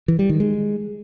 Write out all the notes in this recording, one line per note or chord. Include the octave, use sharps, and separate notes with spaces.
E3
G3
D#3
G#3